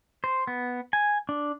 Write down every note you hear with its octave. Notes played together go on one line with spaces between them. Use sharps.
C5
B3
G#5
D4